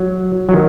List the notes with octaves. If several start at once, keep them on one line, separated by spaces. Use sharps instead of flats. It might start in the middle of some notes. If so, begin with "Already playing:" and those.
Already playing: F#3
F#3
D#3